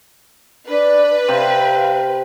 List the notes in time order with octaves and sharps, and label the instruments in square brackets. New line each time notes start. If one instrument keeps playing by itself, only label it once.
[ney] D4 [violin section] B4
[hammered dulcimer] C3 [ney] F5